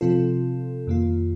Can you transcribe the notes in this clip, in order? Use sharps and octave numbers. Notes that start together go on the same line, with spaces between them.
C3 F3 C4 F4 A4
F2 D#3 A#3 F4